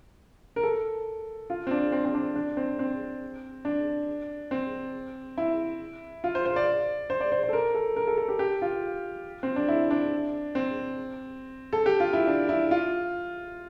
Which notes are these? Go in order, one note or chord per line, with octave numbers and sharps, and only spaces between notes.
A#4
A4
F4
C4
D4
C4
C4
D4
D4
C4
C4
D4
C4
E4
F4
C5
C5
D5
C5
D5
C5
C5
A4
A#4
A4
A#4
A4
A4
G4
G4
F4
C4
D4
E4
D4
C4
A4
G4
F4
E4
D4
E4
F4